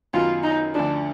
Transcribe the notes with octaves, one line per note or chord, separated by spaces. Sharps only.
F#2 D#3 F#3 B3 F4
D#4
D2 D3 F3 D4